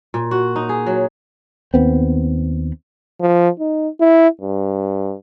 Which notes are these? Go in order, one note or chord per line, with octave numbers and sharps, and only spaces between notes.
A#2
F#4
D#4
G#4
F#3
D#2 B3 C4
F3
D#4
E4
G2